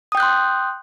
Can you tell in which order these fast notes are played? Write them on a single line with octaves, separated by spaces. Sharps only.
D#6 G5 G6 F#6 C6